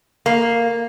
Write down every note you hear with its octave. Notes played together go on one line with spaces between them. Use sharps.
A#3